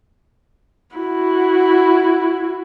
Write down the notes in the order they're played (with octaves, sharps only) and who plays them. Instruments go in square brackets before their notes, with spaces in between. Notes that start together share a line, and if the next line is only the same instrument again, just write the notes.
[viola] E4 F#4